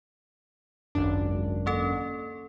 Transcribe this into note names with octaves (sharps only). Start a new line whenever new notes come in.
G#1 C#2 F#2 D4
A#3 C#4 A4